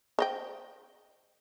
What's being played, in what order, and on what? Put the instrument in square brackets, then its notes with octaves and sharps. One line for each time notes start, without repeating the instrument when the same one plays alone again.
[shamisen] C5 D#5 G5